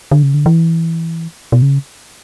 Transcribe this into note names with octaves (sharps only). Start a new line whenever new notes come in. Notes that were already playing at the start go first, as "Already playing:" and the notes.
D3
C#3
D3
E3
B2
C#3